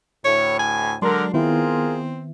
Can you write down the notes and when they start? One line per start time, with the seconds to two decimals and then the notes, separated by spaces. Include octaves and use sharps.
0.25 D2 A2 C#5
0.59 G#5
1.02 D3 F#3 G#3 D4 A#4 C6
1.34 D#3 B3 C4 E4 F4 G#4 A#4